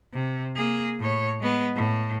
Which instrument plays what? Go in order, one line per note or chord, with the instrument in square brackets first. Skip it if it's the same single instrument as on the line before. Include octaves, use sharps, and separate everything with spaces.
[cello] C3
A#3 G#4
A2 C#5
G#3 B3
A2